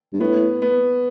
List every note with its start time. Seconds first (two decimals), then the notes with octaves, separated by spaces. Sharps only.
0.13 G2
0.20 A2 B3
0.62 B3